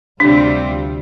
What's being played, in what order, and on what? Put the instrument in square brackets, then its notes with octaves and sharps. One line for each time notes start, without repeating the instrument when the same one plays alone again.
[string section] D2 C3 G3 C4 F4 [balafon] D4